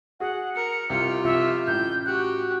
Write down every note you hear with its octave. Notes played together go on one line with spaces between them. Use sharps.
F#4 G#4 F#5
A#4 C#7
C2 F4 G4 C#7
C2 F3 E5
A1 A2 G6
F#4 G4 F#6